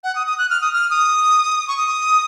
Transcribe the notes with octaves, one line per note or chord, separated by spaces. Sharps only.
F#5
D#6
D#6
F#6
F6
D#6
F6
D#6
C#6
D#6